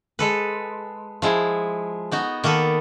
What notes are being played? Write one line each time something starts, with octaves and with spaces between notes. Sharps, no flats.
G#3 A4 B4
F3 G#3 E4
B3 D#4 F#4
D#3 A#3 B3 A4 B4